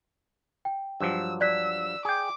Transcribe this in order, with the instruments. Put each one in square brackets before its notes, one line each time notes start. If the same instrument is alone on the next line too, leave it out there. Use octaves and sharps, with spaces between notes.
[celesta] G5
[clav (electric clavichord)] G2 F3 F#3 [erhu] E6
[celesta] D5 F#6 B6 [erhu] E6
[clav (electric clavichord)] G#4 G5 [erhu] D6